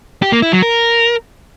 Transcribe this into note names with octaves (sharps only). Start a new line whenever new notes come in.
G4
A#3
E4
F#3
A#4